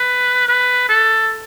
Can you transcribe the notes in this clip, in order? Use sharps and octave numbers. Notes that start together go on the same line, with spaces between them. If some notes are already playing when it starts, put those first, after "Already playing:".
Already playing: B4
B4
A4